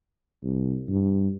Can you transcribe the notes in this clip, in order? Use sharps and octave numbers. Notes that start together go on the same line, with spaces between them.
C2
G2